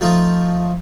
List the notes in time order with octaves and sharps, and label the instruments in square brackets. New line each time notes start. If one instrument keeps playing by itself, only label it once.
[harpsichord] F3 A3 D#4 F4